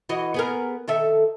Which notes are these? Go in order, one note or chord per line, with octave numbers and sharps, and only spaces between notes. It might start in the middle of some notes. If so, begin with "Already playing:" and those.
E3 F#4 D#5
B3 G#4 A#4
D#3 A4 E5